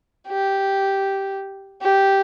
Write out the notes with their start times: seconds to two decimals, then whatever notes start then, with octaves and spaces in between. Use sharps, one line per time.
0.27 G4
1.82 G4